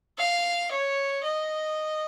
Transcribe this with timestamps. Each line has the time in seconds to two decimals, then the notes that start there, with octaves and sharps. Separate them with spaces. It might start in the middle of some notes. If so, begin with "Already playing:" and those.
0.18 F5
0.71 C#5
1.24 D#5